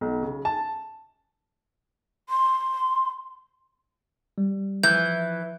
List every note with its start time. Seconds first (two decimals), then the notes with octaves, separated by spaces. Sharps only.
0.01 B1
0.23 C#3
0.45 A5
2.29 C6
4.38 G3
4.83 E3 F3 G6